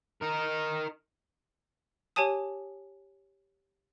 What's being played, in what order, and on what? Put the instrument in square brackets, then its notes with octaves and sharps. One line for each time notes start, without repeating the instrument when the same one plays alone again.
[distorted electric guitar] D#4 A#4
[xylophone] G4 C#5 G#5 A5 D#6